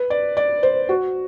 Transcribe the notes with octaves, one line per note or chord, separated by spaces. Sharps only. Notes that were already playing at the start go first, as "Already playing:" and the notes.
Already playing: B4
D5
D5
C5
F#4